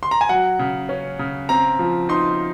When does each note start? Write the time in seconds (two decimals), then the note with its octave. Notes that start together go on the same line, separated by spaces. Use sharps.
0.03 C6
0.11 A#5
0.21 G#5
0.29 F#3 F#5
0.59 C#3
0.89 C#4
1.19 C#3
1.49 C4 A#5
1.79 F3
2.09 D#4 C6